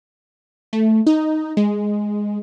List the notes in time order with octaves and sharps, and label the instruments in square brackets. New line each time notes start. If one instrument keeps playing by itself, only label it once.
[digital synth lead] A3
D#4
G#3